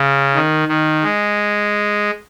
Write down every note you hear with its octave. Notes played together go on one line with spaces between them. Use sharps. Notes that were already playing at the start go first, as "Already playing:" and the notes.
Already playing: C#3
D#3
D#3
G#3